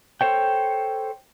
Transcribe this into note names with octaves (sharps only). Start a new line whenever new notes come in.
A4 C5 C#5 G5